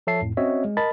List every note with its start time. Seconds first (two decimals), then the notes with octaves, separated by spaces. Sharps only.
0.07 F3 A4 C#5 E5 A5 C7
0.21 F2 A2
0.37 C4 C#4 F#4 C#5 D#5 E5
0.65 G#3
0.77 A#4 D#5 A5 B5 A6